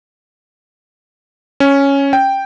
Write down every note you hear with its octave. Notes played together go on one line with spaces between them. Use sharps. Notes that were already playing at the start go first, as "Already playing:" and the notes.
C#4
G5